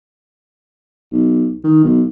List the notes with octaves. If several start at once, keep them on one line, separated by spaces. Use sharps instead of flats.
B1
D#3
B1